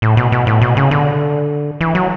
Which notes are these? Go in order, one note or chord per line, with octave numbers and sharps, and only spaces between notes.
A2
B2
B2
A2
B2
C#3
D3
E3
F#3